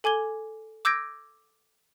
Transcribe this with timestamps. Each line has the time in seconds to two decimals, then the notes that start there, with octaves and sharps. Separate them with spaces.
0.04 A4 G#5 D6 G#6 G7
0.85 D6 E6 G6 G#6 A#6 D7